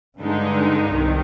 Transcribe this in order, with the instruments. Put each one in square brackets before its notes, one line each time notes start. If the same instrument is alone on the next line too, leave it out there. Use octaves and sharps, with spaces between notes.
[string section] G2 D3 G#3 D#4
C2 C3 D#3